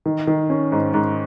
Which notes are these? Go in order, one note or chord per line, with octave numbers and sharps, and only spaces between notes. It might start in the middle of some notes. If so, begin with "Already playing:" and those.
D#3
D#3
C#4
G#2
G#2